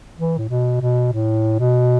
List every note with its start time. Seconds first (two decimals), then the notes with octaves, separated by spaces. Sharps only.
0.17 E3
0.38 A2
0.49 B2
0.81 B2
1.13 A2
1.59 B2